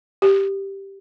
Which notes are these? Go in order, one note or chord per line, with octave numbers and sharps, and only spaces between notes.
G4